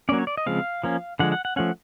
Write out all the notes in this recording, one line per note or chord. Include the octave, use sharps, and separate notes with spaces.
F#3 A#3 C#4 D5
C#5
D5
D#5
C#3 F3 G#3 C4 F5
F3 A#3 C#4
D3 F3 G#3 F#5
F#5
F#5
F3 A3 C#4 F#5